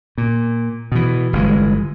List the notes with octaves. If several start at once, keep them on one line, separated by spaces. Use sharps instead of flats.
A#2
B2 E3
G1 E3 G#3